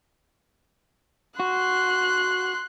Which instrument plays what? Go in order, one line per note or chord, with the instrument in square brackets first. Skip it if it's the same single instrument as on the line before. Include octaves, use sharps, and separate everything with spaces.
[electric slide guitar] F#4 [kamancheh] C6 F#6